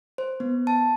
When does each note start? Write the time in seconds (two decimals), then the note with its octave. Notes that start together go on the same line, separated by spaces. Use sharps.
0.18 C5
0.40 B3
0.67 A5